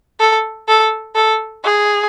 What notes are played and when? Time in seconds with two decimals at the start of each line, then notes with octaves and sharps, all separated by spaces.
0.20 A4
0.68 A4
1.15 A4
1.64 G#4